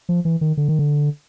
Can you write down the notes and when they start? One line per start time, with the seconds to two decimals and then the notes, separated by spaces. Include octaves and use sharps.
0.09 F3
0.25 E3
0.41 D#3
0.57 D3
0.69 D#3
0.79 D3